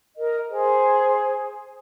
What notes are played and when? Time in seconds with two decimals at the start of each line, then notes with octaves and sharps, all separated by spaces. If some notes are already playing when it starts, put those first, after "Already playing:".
0.16 A#4 D#5
0.49 G#4 C5